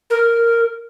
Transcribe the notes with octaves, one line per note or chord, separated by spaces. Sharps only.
A#4